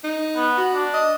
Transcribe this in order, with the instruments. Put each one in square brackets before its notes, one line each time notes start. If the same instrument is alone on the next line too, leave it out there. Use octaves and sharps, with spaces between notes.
[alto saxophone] D#4
[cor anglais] B3
[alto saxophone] F#4
[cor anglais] D4
[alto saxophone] D#5